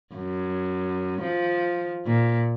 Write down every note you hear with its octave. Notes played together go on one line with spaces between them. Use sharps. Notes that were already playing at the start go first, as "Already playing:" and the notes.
F#2
F3
A#2